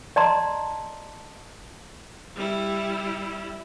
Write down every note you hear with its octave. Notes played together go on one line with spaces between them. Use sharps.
D5 D#5 A5 A#5 C6
G3 E4